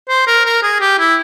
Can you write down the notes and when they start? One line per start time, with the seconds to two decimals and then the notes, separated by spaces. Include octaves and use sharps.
0.09 C5
0.27 A#4
0.45 A#4
0.63 G#4
0.81 G4
0.99 E4